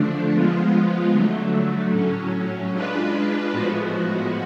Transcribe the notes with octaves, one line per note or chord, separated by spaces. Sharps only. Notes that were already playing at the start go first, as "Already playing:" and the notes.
Already playing: D3 F3 A3 D4
F3 G#3 B3 F4
D3 F#3 A3
A2 F#3 C#4
G#3 D4 F4 B4
A2 F3 G#3 B3 F#4